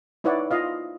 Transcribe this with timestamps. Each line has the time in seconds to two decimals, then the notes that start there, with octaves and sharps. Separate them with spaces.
0.24 D#4 E4 B4 C#5 D5 F#5
0.51 F4 D#5 F5